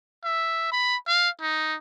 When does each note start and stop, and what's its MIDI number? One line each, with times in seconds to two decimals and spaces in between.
0.24 0.70 76
0.72 0.96 83
1.07 1.30 77
1.41 1.75 63